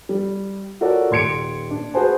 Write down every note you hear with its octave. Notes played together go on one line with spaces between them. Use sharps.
G3
F4 F#4 A4 A#4 C#5 D5
D#1 C6 G#6 C#7 D7
D4
F#4 G#4 B4 C5 G#5 A5